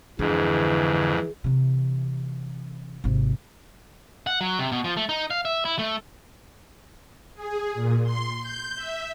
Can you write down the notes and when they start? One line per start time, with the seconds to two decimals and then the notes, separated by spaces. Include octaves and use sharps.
0.19 F2 G#2 D3 E3 G#4
1.44 C3 E3
3.04 G#1 C3
4.27 F#5
4.41 F#3
4.59 C3
4.72 B2
4.84 F3
4.97 A3
5.09 D#4
5.30 F5
5.45 E5
5.65 E4
5.79 A3
7.35 G#4
7.74 A#2
8.03 C6
8.40 G6
8.75 E5